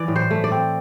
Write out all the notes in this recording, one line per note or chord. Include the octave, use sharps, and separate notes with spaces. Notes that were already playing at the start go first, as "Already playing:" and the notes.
Already playing: E3 D5
A2
C5
A3
D5
C4